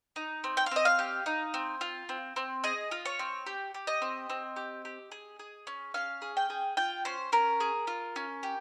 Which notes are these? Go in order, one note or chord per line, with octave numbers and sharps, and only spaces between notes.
D#4
C4
G5
F5
C4 D#5
F5
G4
D#4
C4
F4
C4
C4
G#4 D#5
F4
C#5
C4
G4
G4
D#5
C4
C4
G4
G4
G#4
G#4
C#4
C#4 F5
G#4
G5
G#4
F4 G5
C#4 C5
C#4 A#4
G#4
F4
C#4
G4